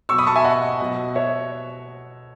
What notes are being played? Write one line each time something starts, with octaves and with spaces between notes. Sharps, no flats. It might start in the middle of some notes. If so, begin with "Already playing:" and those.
B2 F#3 C#6 E6
B5 D#6
A5 C#6
E5 G#5
D#5 F#5
B2 F#3
C#5 E5